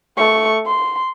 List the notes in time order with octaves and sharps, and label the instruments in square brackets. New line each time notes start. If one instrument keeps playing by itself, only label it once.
[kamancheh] A3 C#6
C6